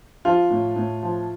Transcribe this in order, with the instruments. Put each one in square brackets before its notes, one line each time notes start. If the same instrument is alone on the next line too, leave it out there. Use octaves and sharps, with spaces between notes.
[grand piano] F3 F4
A2
A2
F3